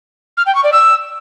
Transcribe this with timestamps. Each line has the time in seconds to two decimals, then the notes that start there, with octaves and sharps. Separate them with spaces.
0.37 F6
0.46 G5
0.55 C#6
0.64 D5
0.72 E6